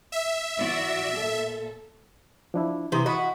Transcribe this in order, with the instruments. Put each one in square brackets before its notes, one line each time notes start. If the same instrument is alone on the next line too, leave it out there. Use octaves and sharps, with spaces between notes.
[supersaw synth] E5
[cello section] E3 F#4 D5
A#2 A4
[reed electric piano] F3 D4 E4
[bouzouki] C3 [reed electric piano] E3 A#5 D#6
[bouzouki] E4 F#4 [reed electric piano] D#5 B5 D#6